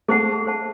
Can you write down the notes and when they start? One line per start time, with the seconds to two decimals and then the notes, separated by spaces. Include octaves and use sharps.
0.08 A3 G#4 C5 F#5 A5
0.46 G#4 C5 F#5 A5